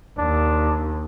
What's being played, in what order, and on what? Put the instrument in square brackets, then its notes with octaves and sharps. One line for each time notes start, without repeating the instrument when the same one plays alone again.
[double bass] D#2 [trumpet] D4